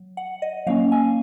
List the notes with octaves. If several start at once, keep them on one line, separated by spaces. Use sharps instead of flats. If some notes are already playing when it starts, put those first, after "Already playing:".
Already playing: F#3
F#5
D#5
F#3 A#3 C#4 F5
G#5